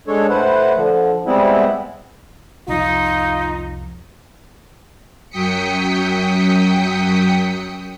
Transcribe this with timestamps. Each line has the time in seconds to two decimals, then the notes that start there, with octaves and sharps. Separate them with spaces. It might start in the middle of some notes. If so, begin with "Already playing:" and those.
0.07 G#3 D4 A4 C#5
0.29 A2 B4 C5 F#5
0.76 D3 F3
1.26 G3 G#3 B3 C4 E4
2.68 C2 F2 F3 D#4 F4
5.30 F#2 F#3 G5 D#6 B6 C#7